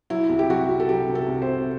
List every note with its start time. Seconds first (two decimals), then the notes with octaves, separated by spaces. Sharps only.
0.10 F#3 E4
0.29 C2
0.39 G4
0.50 F#3 F#4
0.69 C2
0.80 A4
0.89 F#3 G4
1.09 C3
1.15 A4
1.28 C2
1.42 C5
1.47 C3